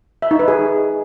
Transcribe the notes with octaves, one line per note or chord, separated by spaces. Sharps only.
E5
D#4
B4
G#4